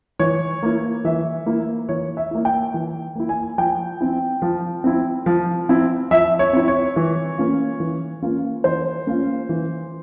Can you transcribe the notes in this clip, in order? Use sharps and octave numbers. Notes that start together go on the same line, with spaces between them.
E3 C#5
A#3 E4
E3 E5
A#3 E4
E3 C#5
E5
A#3 E4
G5
E3
A#3 E4
G#5
F3 G5
C4 E4
F3
C4 E4
F3
C4 E4
F3 E5
C#5
C4 E4
C#5
E3
A#3 C#4 F4
E3
A#3 C#4 F4
E3 C5
A#3 C#4 F4
E3